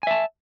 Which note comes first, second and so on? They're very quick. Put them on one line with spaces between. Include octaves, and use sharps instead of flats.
G#5 E5 A5